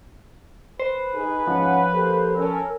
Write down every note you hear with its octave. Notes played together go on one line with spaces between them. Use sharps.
B4 C5
D#4 G#4
G#2 F3 C#4 F#5
A#3 G4 A4 C5
C#4 A4 A#4 E6